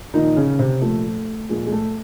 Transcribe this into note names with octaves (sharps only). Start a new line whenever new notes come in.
A#2 D#3 F3 D#4
C#3 C#4
C3 C4
A#2 F3 A3
A#2 F3 G#3
G#3
A3